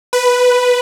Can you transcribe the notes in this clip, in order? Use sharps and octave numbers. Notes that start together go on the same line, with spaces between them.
B4